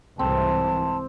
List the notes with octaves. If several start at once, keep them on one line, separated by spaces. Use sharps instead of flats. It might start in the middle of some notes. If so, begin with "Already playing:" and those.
C2 G#2 E3 C4 A5